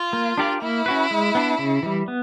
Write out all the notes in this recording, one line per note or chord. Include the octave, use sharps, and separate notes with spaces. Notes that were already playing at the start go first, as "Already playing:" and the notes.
Already playing: F4
A#3
D4 G4 A#4 D5
A#3 E4
C#4 F#4 B4
G#3
B3 D4
C#3
E3 G3
B3